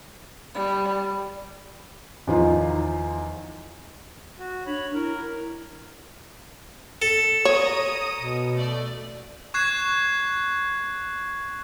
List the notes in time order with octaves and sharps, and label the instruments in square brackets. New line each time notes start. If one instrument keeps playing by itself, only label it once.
[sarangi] G3 [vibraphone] B5
[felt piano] E2 D#3 F3 D#4 F4
[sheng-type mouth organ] F#4
[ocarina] D4 [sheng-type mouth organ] C#5 B5
[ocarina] E4 [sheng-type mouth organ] A#4
[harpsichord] A4
[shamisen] C#5 [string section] A#5 D#6
[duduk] B2
[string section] A3 D5
[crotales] C#6 F#6 G#6 C7 E7